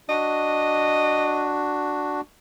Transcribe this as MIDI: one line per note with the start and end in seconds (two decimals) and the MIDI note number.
0.09 2.21 62
0.09 2.21 66
0.09 1.60 75